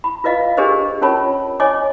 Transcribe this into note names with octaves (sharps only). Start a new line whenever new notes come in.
B5
F4 B4 D#5 F5
D4 G4 G#4 A#4 C5 D#5
C#4 F4 A#4 C#5 A5 B5
C#5 D#5 G#5 D6